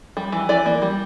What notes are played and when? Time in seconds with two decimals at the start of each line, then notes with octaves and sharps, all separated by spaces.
0.17 G3
0.32 E3
0.49 E3 D5
0.66 A#3
0.82 G3